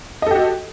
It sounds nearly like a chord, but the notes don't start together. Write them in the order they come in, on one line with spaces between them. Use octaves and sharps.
D#5 A4 G4 F#4